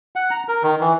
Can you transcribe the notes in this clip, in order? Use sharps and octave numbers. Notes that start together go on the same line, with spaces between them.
F#5
A#5
A#4
D#3
E3